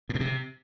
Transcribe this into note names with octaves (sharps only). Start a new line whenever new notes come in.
A2
B2
C3